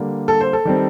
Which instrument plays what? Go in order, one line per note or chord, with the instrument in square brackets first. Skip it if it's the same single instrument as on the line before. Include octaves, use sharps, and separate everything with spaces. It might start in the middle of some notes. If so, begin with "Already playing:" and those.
Already playing: [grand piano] D3 G3 A#3
A4
C5
A4
D#3 G3 C4